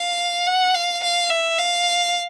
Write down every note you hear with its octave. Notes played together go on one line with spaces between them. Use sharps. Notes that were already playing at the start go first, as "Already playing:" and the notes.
Already playing: F5
F#5
F5
F5
E5
F5